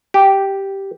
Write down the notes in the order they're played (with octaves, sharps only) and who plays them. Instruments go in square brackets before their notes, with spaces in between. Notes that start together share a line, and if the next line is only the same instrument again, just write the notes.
[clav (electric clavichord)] G4